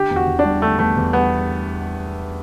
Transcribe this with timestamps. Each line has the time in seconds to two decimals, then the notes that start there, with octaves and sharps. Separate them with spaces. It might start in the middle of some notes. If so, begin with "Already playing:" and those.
Already playing: D3 G4
0.11 E2
0.16 F#4
0.27 E2
0.39 D4
0.45 G3
0.62 D3 A3
0.79 E2 A3
0.97 E2
1.13 G3 B3